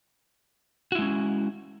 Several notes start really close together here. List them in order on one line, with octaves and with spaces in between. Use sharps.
F#4 E4 G#3 C#4